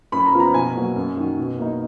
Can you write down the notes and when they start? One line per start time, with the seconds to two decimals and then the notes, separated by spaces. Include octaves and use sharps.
0.12 F#2 B5
0.26 A#5
0.33 F3 B3
0.40 A#5
0.54 B2 G#5
0.75 F#3 A#3
0.96 F#2
1.16 D#3 F#3
1.38 B2
1.59 A#3 D#4